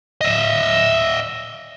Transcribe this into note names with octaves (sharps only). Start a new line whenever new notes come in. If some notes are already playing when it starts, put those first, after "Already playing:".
D#5 E5